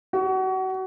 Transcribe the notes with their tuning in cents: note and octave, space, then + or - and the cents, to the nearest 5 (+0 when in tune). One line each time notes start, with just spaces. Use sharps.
F#4 +30